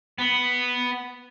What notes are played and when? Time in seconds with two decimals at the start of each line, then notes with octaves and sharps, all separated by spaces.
0.18 B3